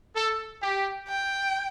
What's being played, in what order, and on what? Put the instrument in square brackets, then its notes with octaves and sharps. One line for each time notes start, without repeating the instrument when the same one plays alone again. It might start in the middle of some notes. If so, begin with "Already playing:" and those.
[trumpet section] A4
G4
[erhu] G5